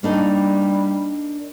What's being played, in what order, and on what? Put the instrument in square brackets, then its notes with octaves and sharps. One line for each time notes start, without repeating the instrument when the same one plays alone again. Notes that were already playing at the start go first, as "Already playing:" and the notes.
[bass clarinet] G3 [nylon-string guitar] A#3 D4 D#4